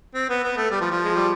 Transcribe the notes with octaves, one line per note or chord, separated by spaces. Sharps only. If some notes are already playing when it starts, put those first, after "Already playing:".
C4
B3
B3
A3
G3
F3
F3
G#3
G3